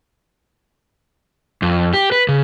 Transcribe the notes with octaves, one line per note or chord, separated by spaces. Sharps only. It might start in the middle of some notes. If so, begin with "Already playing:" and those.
F2
G4
B4
C#3